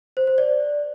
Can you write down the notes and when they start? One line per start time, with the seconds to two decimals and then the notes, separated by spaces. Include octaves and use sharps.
0.17 C5
0.27 C5
0.38 D5